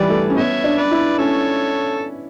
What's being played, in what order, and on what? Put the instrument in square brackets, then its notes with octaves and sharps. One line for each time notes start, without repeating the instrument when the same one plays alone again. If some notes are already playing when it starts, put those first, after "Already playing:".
Already playing: [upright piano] E3 G3 [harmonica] B4 D5
[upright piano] A3
C#4
[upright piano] B3 [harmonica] C#5 E5
[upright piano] D4
[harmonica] B4 D5
[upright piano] E4
[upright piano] C#4 [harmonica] A4 C#5